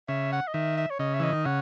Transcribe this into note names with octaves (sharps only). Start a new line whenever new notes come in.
C#3 E5
F#5
D#5
D#3 E5
E5
C#5
C#3 D#5
E5
E3 D#5
D#3
C#3 F#5